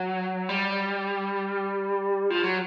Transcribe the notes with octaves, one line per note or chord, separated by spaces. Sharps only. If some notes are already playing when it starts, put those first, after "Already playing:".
Already playing: F#3
G3
F3
F#3